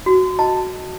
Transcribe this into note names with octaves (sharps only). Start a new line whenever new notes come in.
F#4
D#5 A5